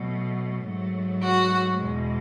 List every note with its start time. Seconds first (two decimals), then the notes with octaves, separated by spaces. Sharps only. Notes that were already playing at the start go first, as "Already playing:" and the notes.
Already playing: B2 F#3 A3
0.65 G#2 F#3 A3
1.22 F#4
1.82 E2 B2 G#3